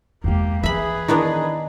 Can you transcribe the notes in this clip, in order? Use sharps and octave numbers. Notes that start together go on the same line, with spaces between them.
E2 G#3 A#3 G4
E3 G#4 B4 E5 B5
D#3 B3 D4 E4